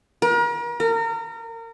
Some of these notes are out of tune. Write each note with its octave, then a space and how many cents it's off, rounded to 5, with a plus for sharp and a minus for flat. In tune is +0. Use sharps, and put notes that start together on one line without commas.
A#4 +40
A#4 -30